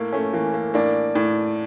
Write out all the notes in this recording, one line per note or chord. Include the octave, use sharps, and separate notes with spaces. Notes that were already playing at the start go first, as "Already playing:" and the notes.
Already playing: A2 A#3
A3 C#4
E3 A#3
A#3
A2 A#3 D4
A2